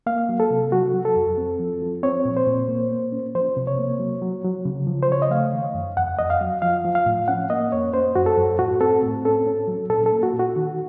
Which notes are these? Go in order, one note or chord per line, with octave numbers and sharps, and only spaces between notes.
A#3 F5
F#3
A4
C3
F#3 F#4
F#3
A4
F2
C4
F3
F3
C4 C#5
A#2
C5
A#2
A#3
A#3
C#4
F3 C5
C3
C#5
A#3
F#3
F#3
F#3
C#3
F3
C5
C#3 C#5
D#5
A3 F5
D#3
F#2
F2 F#5
F2 D#5
F5
F#3
F3 F5
F3
F5
A2
C#4 F#5
A#3 D#5
F2 C#5
C#4 C5
F#2 F#4
A4
F#2
A2 F#4
C4 A4
A2
C#4 A4
C#4
F#3
A#2 A4
A4
A#3
F#4
A#2
F#4
D#3